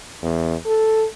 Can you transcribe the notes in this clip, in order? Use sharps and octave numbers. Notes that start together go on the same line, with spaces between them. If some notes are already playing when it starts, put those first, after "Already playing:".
E2
A4